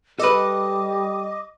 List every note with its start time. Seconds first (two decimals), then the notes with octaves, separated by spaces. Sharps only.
0.19 G3 A4 B4 D#5 D6